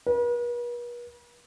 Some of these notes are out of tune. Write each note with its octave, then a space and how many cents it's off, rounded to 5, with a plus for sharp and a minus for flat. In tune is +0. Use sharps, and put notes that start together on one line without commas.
B4 -45